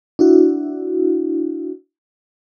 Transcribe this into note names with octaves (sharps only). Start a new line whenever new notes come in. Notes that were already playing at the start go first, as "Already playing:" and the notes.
D4 E4 F#4